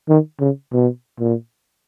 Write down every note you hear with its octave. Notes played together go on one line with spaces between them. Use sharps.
D#3
C#3
B2
A#2